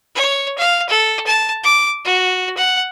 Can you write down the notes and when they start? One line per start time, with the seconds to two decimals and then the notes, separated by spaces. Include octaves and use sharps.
0.15 C#5
0.58 F5
0.89 A4
1.26 A5
1.63 D6
2.05 F#4
2.57 F#5